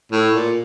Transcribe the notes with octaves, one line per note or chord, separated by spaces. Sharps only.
A2
A#2